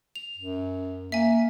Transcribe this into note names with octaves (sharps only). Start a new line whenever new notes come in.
F7
F#2
A#3 E5 G#5